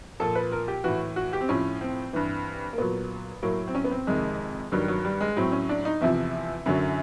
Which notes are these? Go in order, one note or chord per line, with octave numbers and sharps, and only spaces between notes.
A#2 F3 A4
B4
A#4
G4
A2 E3 F#4
F#4
G4
C4
A2 F3 C#4
C4
G2 E3
A#3
A#2 F#3 B3
A2 F#3 A#3
C4
C#4
B3
C4
F2 C3 D#3 G#3
G2 D#3 F#3 G3
F#3
G3
G#3
A2 F#3 C4
C#4
D4
D#4
E2 C3 F3 E4
F#2 D3 F#3